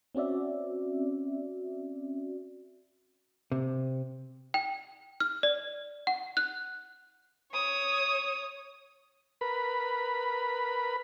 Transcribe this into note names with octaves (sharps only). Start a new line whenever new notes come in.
C4 C#4 F#4 D5 E5
C3
G5
F6
D5
F#5
F#6
C#5 D#6
A#4 B4 B5